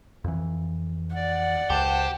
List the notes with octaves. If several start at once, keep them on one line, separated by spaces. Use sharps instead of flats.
F2 E3
D5 F#5
C#2 G4 C5 A5